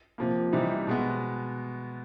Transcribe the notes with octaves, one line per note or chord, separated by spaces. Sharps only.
C3 F3 A#3
C3 E3 G3 C4 D#4
B2 G#3 B3